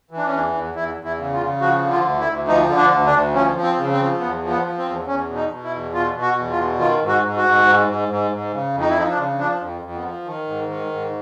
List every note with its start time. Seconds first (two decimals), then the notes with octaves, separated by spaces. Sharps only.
0.11 E3
0.18 D4
0.26 C#4
0.32 E2 D4
0.53 E2
0.75 E2 E4
0.97 E2
1.04 E4
1.18 C#3
1.33 F4
1.41 C#3
1.61 F3 F#4
1.83 D3
1.90 F4
2.04 D2
2.20 E4
2.26 D2
2.48 F3 D#4
2.69 D3
2.77 D4
2.91 D2
3.06 D4
3.12 D2
3.34 F3 C#4
3.55 F3
3.63 C4
3.77 C#3
3.92 C4
3.99 F3
4.20 E2 B3
4.43 F3
4.50 B3
4.64 F3
4.78 C4
4.86 E2
5.07 E2 C#4
5.28 B2
5.36 D#4
5.50 B2
5.64 E4
5.71 E2
5.93 B2 F4
6.14 B2
6.22 F#4
6.37 E2
6.51 F4
6.58 B2
6.79 D#3 F4
7.02 G#2
7.08 F#4
7.23 G#2
7.37 F#4
7.44 G#2
7.65 G#2
7.87 G#2
8.08 G#2
8.31 G#2
8.52 C#3
8.73 F2
8.80 D#4
8.90 E4
8.96 F3 D#4
9.10 D4
9.16 C#3
9.38 F3 D4
9.59 F2
9.82 F2
9.95 B3
10.04 F3
10.25 D#3
10.47 G#2
10.67 D#3
10.89 G#2